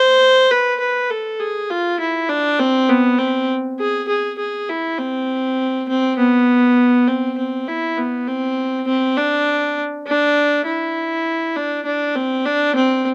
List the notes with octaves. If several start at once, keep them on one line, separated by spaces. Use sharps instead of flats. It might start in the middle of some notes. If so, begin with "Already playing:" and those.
Already playing: C5
B4
B4
A4
G#4
F4
E4
D4
C4
B3
C4
G#4
G#4
G#4
E4
C4
C4
B3
C4
C4
E4
B3
C4
C4
D4
D4
E4
D4
D4
C4
D4
C4